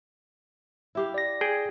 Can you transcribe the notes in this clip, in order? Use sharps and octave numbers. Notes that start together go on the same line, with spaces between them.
E4 G4 F5
D5 A#6
G#4 G5